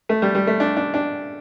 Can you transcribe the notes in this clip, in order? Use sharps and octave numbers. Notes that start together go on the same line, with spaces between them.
A3
G3
G3
A3
D4
D4
D4